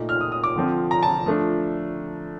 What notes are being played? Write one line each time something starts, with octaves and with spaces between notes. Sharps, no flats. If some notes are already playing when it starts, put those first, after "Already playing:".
Already playing: A#2 A3 D#4
F6
D#6
D#6
D6
D3 F3 C4
A#5
A5
F3 A3 D4